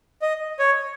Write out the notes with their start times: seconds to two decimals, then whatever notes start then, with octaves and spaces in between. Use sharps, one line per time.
0.22 D#5
0.59 C#5